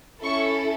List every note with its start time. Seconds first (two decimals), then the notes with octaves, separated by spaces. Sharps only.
0.23 C#4 E4 A4 C#6